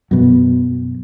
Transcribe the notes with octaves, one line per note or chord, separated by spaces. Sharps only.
F#2 B2